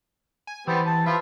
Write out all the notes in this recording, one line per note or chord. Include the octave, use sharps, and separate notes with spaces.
G#5
E3 G3 B3 C4
A5
F3 F4 B4 E5